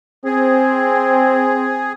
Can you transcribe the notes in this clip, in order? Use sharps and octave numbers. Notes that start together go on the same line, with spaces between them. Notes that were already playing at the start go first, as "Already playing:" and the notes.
C4 G#4